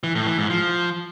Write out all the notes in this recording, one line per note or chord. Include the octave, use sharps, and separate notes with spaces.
E3
A2
E3
G#2
F3